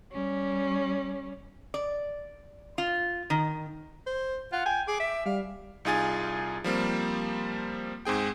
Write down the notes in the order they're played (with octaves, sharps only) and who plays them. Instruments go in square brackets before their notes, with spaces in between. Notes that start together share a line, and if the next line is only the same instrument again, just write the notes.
[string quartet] G3 C#4
[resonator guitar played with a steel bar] D5
F4
D#3
[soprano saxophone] C5
[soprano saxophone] F4 [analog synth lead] F#5
[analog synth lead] G5 [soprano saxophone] G#5
[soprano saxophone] G#4 [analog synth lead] D6
[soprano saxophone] E5
[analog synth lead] G3 [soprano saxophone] F5
[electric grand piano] C2 D#4 F4 G#4 G#5 A6
F3 G3 A#3 C4
G#2 C4 G#4 G5